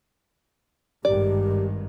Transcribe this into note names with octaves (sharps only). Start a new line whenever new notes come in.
G#1 G2 D#3 G4 D5